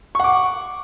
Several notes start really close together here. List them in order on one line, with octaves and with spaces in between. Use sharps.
C#6 F#5 D6